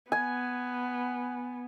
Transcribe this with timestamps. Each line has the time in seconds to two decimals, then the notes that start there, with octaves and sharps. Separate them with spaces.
0.12 B3 G#5